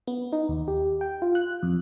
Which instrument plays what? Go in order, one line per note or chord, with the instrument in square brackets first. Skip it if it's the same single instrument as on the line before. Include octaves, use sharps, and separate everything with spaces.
[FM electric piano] B3
D#4
D#2
G4
G5
F4
F#6
F2